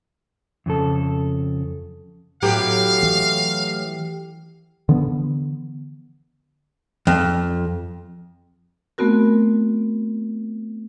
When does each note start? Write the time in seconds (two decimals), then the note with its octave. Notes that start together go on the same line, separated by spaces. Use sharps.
0.66 F2 C#3 A4
2.42 A2 F#3 B3 G4 F5
3.03 E3
4.89 D3 E3 F3 B3
7.07 F2
8.98 A3 B3 C4 F#4 A#4